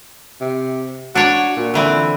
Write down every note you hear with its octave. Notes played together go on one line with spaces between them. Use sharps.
C3
D4 F#4 C#5
A#2
D3 E3 C4